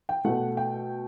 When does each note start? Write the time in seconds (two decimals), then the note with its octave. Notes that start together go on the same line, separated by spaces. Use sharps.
0.09 G5
0.25 B2 A3 F#5
0.57 G5